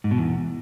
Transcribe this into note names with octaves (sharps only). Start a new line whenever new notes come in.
G#2
B2
E2